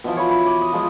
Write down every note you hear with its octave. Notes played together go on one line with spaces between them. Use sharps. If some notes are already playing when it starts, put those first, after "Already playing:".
B2 E3 F3
C#5 B5
F#5 B5
D6
D#5
F3 G#3 D#5